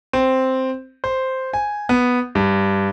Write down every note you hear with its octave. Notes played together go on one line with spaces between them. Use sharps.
C4
C5
G#5
B3
G2